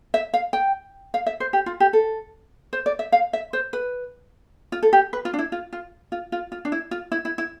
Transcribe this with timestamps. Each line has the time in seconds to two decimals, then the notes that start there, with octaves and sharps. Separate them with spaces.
0.14 E5
0.34 F5
0.53 G5
1.14 F5
1.26 E5
1.40 C5
1.53 G4
1.66 F4
1.80 G4
1.93 A4
2.73 C5
2.86 D5
2.99 E5
3.12 F5
3.33 E5
3.53 C5
3.73 B4
4.72 F4
4.83 A4
4.93 G4
5.13 B4
5.25 F4
5.33 D4
5.39 E4
5.52 F4
5.73 F4
6.12 F4
6.32 F4
6.52 F4
6.65 D4
6.72 E4
6.91 F4
7.12 E4
7.25 E4
7.38 E4